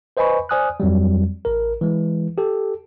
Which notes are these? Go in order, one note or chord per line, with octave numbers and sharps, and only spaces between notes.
B4 C5 D#5 G#5 B5 C#6
C5 D5 G#5 D#6 F6 F#6
F2 F#3 G3
A1 A#4
E3 G#3
G4 A4